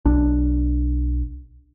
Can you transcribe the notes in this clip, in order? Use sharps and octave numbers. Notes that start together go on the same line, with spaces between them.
B1 D4